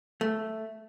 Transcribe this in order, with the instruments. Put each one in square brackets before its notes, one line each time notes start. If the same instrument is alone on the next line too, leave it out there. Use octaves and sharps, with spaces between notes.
[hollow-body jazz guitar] A3